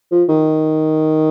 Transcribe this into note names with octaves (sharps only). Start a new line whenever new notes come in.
F3
D#3